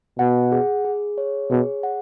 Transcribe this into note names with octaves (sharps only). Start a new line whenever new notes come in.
B2 F#5
G#4
G#4
C#5
B2 G#4
F#5